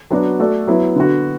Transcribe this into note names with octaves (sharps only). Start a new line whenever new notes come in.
F#3 B3 D4 F#4 D5
A3 F#4 A4 D5
F#3 B3 E4
D3 B3 F#4